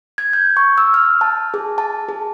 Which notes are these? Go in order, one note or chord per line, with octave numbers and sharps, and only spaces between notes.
G#6
G6
C#6
E6
F6
A5
G#4
A5
G#4